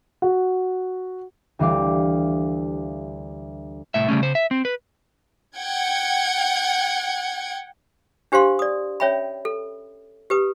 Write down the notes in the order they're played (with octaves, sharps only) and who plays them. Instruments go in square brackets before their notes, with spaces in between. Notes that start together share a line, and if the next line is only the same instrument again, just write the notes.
[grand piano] F#4
[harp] D2 E3 G3 D#5 F5 D6
[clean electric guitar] C2 A2 E5
C#3 G3 A3 C#4
C#3 C5
E5
C4
B4
[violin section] F#5 G5 G#6
[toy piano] D4 G4 C5 F5 C6
D5 D#6
C#4 C#5 E5 G5 B5
A4
G4 B4 D#6